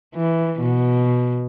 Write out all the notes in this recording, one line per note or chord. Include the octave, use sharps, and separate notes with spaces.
E3
B2